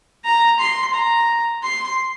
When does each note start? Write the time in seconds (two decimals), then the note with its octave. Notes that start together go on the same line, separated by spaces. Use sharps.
0.25 A#5
0.59 C6
0.94 A#5
1.63 C6